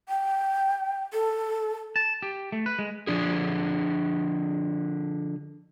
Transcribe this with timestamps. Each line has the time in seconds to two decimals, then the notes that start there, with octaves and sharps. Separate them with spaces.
0.09 G5
1.13 A4
1.96 A5
2.22 G4
2.52 A3
2.66 B4
2.79 G#3
3.07 D3 F3 D4 G#4